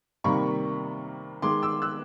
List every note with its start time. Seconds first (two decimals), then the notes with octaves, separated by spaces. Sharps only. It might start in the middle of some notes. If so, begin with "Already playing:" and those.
0.24 C3 D#3 G3 A#3 B5 C#6
1.42 D#3 G#3 C6 D6
1.62 D6 E6
1.82 E6 F#6